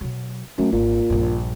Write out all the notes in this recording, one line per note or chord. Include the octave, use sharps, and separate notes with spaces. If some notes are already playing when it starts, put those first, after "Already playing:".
B2 F#3
F#2 D#3 A3
G#1 A#2
A#1 G2